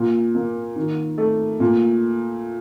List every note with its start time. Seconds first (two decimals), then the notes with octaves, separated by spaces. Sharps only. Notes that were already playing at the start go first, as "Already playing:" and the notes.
Already playing: A#2
0.35 A#3
0.76 D#3
1.18 A3
1.60 A#2